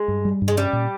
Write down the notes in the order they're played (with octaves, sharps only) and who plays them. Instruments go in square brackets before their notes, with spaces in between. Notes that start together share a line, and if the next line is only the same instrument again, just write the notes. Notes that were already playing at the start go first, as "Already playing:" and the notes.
Already playing: [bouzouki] G#3
[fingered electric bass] G2
G3
G2
[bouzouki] G#3
[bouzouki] G3 [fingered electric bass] C#4
[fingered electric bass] A#2